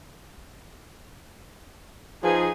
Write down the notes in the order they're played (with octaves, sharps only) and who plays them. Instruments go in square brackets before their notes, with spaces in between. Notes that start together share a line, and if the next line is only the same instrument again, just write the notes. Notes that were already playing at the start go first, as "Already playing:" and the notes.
[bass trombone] F3 [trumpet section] D#4 G#4 [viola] B4 G#5